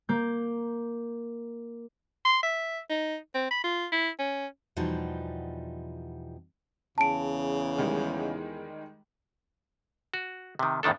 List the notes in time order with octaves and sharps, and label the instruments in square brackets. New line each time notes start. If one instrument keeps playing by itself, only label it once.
[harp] A#3 G6
[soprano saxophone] C6
E5
D#4
C4
B5
F4
E4
C#4
[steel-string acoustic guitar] E2 B2 F3 G3 D#4 A5
[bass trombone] E2 [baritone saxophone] C#3 [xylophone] A5 D7
[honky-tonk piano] D#3 G3 G#3
[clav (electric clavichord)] F#4
C3 D#3
E2 A2 D#3 D4 A4